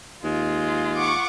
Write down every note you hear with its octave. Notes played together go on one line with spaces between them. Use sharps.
D#2 G#3 F4
F#5 C#6 D6